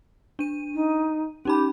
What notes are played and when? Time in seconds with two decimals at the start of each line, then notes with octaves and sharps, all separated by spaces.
0.39 D4 D#7
0.74 D#4
1.45 C#4 D#4 G4 B5